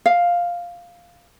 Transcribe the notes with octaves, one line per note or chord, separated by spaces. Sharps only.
F5